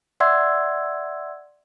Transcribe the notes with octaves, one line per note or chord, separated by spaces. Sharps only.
D5 E5 F#5 C6 E6 G#6